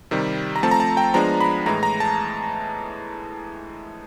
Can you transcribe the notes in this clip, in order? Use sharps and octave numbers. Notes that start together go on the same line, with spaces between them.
C3 D#3 G3
A#5
F3 A3 C4 A5
A#5
A5
G5
F3 G#3 B3 D4 A#5
B5
A2 E3 G#3 A#5
A#5
A5